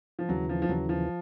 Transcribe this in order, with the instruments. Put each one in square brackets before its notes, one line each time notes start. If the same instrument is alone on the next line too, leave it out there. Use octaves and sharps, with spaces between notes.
[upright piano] F3
[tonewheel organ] D#2 C#3 E3 [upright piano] F#3
[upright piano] F3
F3
[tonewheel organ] D#2 C#3 E3 [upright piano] F#3
[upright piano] F3